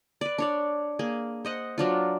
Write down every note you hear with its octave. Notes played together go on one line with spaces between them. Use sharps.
B4 D5
D4 C#5 D5
A#3 G#4
C5 D#5 F#5
F#3 D4 F4